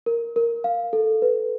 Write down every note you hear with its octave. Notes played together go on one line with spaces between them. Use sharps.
A#4
A#4
F5
A4
B4